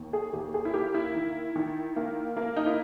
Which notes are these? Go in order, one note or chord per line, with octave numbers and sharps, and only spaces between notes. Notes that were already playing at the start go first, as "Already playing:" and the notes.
Already playing: D#2
G#4
D#2 G4
G#4
E4
A#3 G4
E4
D#3
D#3
A#3
A#3
D#4
E4